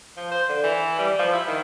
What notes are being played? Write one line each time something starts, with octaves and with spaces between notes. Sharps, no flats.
F3
C5
D3
E3
G3
F3
E4
D#3